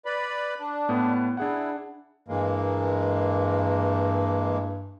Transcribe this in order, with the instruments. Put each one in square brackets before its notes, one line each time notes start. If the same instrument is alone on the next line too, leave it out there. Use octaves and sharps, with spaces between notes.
[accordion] B4 D5 B5
D4
[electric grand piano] A2 B3
[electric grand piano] D4 G#4 F#5 [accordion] E4
[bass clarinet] G2 [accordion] E3 G#3 A#3